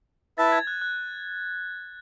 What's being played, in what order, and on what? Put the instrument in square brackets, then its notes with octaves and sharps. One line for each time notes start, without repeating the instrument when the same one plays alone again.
[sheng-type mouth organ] E4 B4 E5 A5 [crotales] A6
[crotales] G#6
F#6
F#6